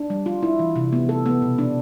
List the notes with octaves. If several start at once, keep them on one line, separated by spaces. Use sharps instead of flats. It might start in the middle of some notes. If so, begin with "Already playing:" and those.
Already playing: D4
G3
F4
E4
E3
C3
B3
A4
B3
B2
D4